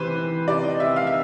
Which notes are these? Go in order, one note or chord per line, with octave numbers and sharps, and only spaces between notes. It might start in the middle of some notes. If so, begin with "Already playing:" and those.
Already playing: C3 E3 B4 C5
E3
C3 D5
D#5
C3 E5
F5
E5